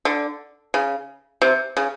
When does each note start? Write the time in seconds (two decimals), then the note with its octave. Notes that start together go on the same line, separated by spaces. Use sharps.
0.05 D3
0.74 C#3
1.42 C3
1.77 C#3